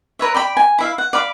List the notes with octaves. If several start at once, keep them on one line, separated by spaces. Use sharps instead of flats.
A#4 B4 C#5 E5
D5 G5 B5
G#5
E4 E5 F5
F#5
D5 F5 B5